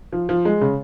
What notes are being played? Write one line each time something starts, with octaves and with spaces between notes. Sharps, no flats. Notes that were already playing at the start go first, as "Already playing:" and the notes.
F3
F3
G#3
C#3